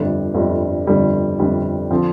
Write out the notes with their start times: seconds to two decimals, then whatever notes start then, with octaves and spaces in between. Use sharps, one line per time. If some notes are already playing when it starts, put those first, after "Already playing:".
Already playing: G1 F2 D3 G3 D4
0.34 G1 F2 D3 G3 D4
0.86 G1 F2 D3 G3 D4
1.39 G1 F2 D3 G3 D4
1.91 D3 F3 C4